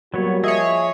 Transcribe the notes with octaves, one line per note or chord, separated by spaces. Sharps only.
F#3 G3 A#3 B3 F#4 C#5
F3 G#4 C#5 D#5 E5 D#6